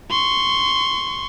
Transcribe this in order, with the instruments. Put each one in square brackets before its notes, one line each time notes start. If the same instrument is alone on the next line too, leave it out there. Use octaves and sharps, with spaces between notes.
[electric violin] C6 C#6